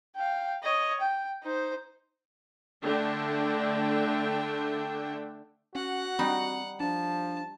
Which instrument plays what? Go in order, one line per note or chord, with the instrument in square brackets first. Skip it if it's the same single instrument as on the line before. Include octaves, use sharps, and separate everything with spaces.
[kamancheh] F5 G5
C#5 D#5
G5
D#4 C5
[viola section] D3 A3 D4 G5
[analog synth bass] C#4 [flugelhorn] F#4 [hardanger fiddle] F#5
[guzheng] G3 D#4 [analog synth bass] C4
[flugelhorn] F3 [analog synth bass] D4 [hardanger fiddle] A5